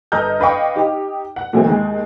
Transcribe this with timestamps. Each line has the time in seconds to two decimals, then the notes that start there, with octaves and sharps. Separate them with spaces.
0.12 G1 A4 D#5 A#5 F6 G6
0.40 D4 B4 D#5 F5 G5 C#6
0.76 D#4 G4
1.36 F#5
1.53 A#2 D3 E3 F#3 G#3 C4
1.67 D#2 D#3 G#3